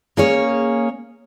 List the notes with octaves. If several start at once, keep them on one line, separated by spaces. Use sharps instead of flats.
A#3 C#4 G#4 C#5